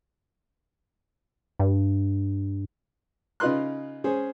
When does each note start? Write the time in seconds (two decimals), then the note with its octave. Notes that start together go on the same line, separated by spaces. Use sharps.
1.59 G2
3.40 C#3 D#4 F4 B4 C6 F#6
4.04 C#4 G#4 C5